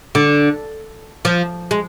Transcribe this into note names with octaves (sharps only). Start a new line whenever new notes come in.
D3
F3
G#3